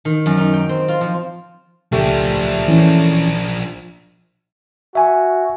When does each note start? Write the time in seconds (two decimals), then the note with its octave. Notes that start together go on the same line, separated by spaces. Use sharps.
0.05 D#3
0.26 F#2
0.37 D#4
0.53 G5
0.69 C4
0.88 F4
1.01 F3
1.92 C#2 F3 A3 D4 G4
2.68 E3 C#4
4.95 F#4 E5 G#5 C#6